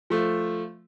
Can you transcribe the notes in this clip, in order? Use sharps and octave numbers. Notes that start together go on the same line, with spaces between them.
F3 A3